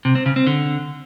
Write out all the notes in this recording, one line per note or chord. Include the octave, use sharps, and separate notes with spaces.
C3
C4
C#3
C4
D3